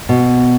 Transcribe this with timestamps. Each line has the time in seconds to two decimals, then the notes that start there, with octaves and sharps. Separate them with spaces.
0.09 B2